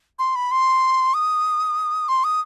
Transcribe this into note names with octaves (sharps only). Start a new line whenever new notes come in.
C6
B5
C6
D#6
C6
D#6